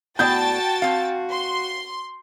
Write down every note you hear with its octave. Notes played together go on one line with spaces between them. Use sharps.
A2 B3 F#4 D5 G5 A5 G6 A6
C4 F5
C6